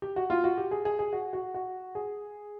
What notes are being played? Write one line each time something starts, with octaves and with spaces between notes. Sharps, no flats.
G4
F#4
F4
F#4
G4
G#4
G#4
G#4
F#4
F#4
F#4
G#4